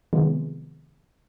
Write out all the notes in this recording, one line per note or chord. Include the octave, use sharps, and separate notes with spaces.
C3 D#3 F3 F#3 G#3 B3